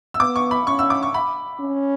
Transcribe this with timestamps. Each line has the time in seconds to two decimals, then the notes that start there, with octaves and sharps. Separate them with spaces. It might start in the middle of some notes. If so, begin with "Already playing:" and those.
0.14 E6
0.19 B3 D6
0.36 C#6
0.51 B5
0.67 C#4 C#6
0.79 E6
0.90 D6
1.03 C#6
1.14 B5
1.60 C#4